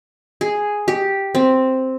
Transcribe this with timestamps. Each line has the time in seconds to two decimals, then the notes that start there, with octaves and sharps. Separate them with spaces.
0.41 G#4
0.88 G4
1.35 C4